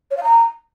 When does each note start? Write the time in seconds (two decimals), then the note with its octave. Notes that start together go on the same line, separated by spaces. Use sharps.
0.11 C#5
0.17 F5
0.23 A#5